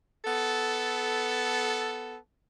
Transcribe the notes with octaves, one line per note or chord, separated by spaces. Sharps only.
B3 A4